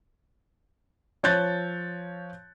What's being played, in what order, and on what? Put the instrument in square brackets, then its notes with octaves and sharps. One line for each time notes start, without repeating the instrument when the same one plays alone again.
[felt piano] F3 C#5 F#6 G6 A6